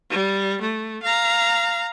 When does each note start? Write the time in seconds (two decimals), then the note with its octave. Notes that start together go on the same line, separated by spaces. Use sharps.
0.10 G3
0.62 A3
1.02 F5 A#5